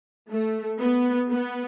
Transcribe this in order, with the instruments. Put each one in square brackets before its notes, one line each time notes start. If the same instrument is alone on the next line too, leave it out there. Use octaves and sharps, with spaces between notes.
[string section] A3
B3
B3